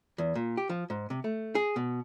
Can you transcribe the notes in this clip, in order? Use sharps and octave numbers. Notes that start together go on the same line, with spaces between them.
E2
A#2
G4
F3
G#2
C3
A3
G#4
B2